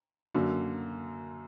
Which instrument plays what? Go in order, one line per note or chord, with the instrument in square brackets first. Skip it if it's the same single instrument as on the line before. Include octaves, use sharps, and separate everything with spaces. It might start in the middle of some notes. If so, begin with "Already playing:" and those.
[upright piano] F#2 D3 F#3 A#3